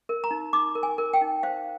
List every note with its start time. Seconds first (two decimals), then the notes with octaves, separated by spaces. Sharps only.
0.09 A#4
0.24 A#5
0.31 D#4
0.53 D#4 D6
0.75 A#4
0.83 G#5
0.98 A#4
1.14 G5
1.21 D#4
1.43 C5 F5